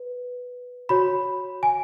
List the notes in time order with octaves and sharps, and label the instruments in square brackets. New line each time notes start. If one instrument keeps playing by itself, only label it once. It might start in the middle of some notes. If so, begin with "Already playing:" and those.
Already playing: [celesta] B4
F#4 C#5 B5
G#5